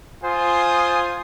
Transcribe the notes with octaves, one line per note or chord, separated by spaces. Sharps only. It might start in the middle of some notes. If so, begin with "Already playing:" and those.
F4 C5 G#5 D#6